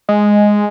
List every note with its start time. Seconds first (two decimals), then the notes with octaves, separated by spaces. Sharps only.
0.09 G#3